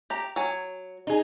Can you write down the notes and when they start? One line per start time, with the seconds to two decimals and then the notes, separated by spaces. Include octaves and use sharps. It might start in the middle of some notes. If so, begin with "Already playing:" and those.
0.10 G4 A#5
0.36 F#3 G#5
1.07 D#4 G#4